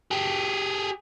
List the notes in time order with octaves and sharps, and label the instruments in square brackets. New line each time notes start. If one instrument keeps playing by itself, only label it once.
[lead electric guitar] G4 G#4